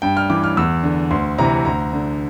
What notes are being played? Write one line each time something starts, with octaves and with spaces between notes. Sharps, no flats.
G2 G5
F6
E3 D6
F6
E2 E6
D3
D2 C6
C3 E3 A#5
D2 A#5
D3